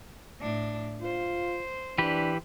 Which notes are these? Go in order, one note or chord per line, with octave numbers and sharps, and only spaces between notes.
A2 D4
F4 C5
E3 D4 G4 B4